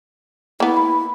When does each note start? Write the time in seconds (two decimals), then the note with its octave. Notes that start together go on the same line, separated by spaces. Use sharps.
0.60 A#3 B3 E4
0.77 B5